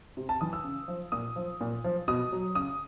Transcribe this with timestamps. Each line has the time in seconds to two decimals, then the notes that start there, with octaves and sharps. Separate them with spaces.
0.17 C3
0.29 A5
0.41 E3 D#6
0.53 E6
0.64 C#3
0.88 F3
1.12 A#2 D#6
1.36 F3
1.61 A#2
1.84 F3
2.08 B2 D#6
2.32 F#3
2.55 C#3 D#6